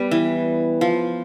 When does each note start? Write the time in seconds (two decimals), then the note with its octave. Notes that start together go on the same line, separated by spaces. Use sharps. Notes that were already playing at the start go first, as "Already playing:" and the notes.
Already playing: G3 B3
0.11 E3
0.81 F3